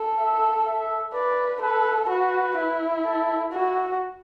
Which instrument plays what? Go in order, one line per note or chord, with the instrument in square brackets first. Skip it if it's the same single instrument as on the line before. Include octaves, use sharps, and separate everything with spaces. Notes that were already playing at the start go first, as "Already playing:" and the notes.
Already playing: [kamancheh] A4
[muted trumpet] E5
E5
[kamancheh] B4 [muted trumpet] D5
[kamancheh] A4 [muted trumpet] B4
[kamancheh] F#4 [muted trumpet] B4
[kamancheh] E4
[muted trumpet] A4
[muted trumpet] E4 [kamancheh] F#4